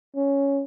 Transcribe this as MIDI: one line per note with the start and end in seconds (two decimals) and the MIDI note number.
0.16 0.65 61